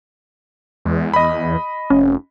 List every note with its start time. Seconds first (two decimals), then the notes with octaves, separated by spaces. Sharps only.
0.85 E2 G#3
1.14 D#5 B5
1.90 F1 C#4